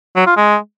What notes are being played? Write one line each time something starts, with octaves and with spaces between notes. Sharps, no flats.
F#3
F4
G#3